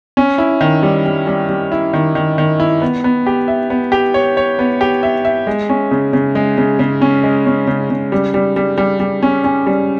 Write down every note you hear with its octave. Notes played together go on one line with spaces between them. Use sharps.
C#4
E4
D#3
G3
G3
G3
G3
E4
D#3
D#3
D#3
E4
B3
B3
G4
E5
B3
G4
C#5
C#5
B3
G4
E5
E5
G#3
C#4
C#3
C#3
G#3
C#3
C#3
C#4
G#3
C#4
C#3
C#3
G3
G3
G3
G3
G3
C#4
C#4
G3